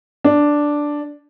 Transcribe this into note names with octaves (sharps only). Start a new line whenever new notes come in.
D4